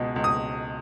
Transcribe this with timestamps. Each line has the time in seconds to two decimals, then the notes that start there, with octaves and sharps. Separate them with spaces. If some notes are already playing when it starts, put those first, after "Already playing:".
Already playing: C#2 B2 G#3
0.16 C#2
0.24 D#6